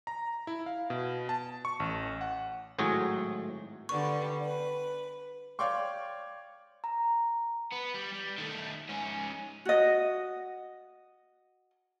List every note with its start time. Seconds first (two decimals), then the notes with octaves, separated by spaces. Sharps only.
0.07 A#5
0.47 E4
0.66 F5
0.90 B2
1.29 A5
1.65 C#6
1.80 A1
2.21 F#5
2.79 G#1 A2 F#3 G#4 C#5
3.89 D3 G3 B3 C#6
4.44 B4
5.59 C#5 D5 F5 G5 C6 C#6
6.84 A#5
7.72 B3
7.94 G3
8.13 G3
8.38 D#3 A3
8.89 G#2 C#4
9.65 F#4 D#5